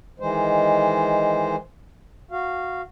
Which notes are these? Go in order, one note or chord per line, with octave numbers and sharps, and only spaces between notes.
D#3 E3 G#3 C5
F#4 F5